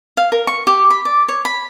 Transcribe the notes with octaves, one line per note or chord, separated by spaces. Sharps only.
F5
A#4
C#6
G4
B5
D5
C#5
B5